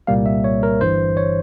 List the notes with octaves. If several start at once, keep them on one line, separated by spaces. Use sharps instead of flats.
C2 A#2 G3 A#3 F5
E5
C#5
A#4
G1 G2 E3 C5
C#5